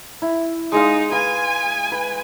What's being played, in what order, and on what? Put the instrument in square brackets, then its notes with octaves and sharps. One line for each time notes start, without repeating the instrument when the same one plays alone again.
[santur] E4
[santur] G#3 G#4 F5 [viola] D#4
[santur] B4 F5 [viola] G#5
[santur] B4